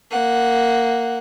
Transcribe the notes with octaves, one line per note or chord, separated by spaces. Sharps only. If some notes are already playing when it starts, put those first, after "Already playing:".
A#3 F#5